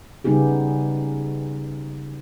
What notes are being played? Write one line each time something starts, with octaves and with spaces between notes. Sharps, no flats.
C#3 G3 B3 D#4 G4 G#4